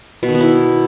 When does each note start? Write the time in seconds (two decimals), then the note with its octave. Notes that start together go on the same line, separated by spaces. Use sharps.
0.23 B2
0.29 D#3
0.35 B3
0.40 E4